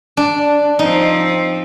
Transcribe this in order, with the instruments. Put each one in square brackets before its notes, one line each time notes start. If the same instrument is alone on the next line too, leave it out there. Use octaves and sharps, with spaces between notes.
[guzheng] D4
[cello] F3 C4 [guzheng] D#4